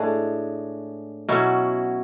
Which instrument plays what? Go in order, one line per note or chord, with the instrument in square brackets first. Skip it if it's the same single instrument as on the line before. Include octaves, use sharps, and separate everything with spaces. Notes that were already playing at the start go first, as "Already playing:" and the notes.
Already playing: [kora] A2 G#3 D4 G#4
B2 F#3 C#4 E4